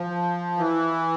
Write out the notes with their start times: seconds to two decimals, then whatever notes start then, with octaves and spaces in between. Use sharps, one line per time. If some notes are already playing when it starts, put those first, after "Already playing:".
Already playing: F3
0.58 E3